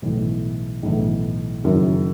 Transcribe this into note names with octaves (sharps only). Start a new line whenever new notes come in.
B1 A2 E3
B1 A2 E3
F#1 F#2 D#3 F#3